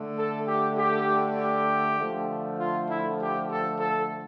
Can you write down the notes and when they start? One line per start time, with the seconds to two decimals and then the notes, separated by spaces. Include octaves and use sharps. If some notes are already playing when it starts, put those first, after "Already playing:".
Already playing: D3 A3
0.18 A4
0.47 G4
0.77 G4
1.37 G4
1.98 D3 F3 A3
2.58 F4
2.88 E4
3.19 G4
3.50 A4
3.79 A4